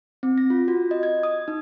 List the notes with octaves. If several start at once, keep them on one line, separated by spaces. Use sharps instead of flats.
C4
A#6
F4
F#4
D#5
G#6
D#6
D#4